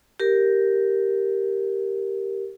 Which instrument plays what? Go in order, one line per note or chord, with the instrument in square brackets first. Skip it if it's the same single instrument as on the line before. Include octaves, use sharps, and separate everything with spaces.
[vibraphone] G4 A#4